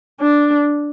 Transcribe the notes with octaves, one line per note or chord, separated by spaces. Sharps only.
D4